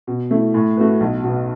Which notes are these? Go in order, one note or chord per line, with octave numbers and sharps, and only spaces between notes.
B2
A3 E4
A2
A3 F#4 B4
B1
B2 B3